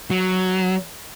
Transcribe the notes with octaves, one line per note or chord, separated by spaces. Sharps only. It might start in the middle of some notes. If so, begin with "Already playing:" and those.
F#3